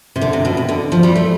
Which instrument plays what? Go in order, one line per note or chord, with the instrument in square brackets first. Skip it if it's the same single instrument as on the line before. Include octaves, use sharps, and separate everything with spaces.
[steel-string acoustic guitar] C3
D3
C3
B2
C3
D3
F3
G3
A3